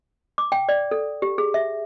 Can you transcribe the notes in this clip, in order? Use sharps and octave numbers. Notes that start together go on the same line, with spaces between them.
D6
G5
D5
A4
G4
G#4
E5